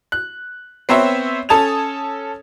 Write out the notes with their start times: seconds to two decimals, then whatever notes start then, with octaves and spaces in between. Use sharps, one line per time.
0.12 F#6
0.89 B3 C4 C5 C#5 E5
1.49 C#4 A4 A5 D#6 G#6 F7